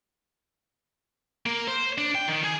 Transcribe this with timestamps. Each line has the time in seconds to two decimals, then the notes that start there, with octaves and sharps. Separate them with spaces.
1.46 A#3
1.68 C5
1.98 D4
2.15 G5
2.28 D#3
2.44 G#4